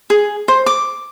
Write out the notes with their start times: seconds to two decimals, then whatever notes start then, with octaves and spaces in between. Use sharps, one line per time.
0.10 G#4
0.48 C5
0.66 D6